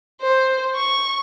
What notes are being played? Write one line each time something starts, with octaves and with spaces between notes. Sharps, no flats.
C5
C#6